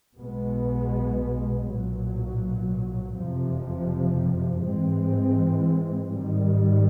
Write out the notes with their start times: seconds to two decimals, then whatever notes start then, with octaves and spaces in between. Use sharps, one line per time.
0.16 B1 B2 G#3 B3
1.67 B1 A#2 F#3
3.16 F#1 F2 C3 F3
4.66 G#2 E3 G#3 C4
6.17 G#2 D#3 G3